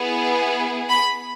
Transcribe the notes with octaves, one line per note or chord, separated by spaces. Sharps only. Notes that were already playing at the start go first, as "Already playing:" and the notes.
Already playing: B3 E4 G#4
B5